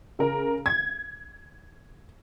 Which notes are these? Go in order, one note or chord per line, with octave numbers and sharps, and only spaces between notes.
C#3 A#4
G#6